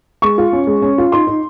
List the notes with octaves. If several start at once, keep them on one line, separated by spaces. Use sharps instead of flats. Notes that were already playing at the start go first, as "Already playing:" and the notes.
G#3 C#6
F4
C#4
G#3
C#4
F4
D#4 C6
D#4